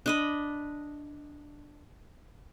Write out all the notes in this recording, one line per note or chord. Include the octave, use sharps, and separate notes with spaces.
D4 D#5 B5